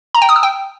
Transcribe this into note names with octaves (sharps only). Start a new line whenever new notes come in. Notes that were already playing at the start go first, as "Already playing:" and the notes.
A#5
G5
D#6
E6
G5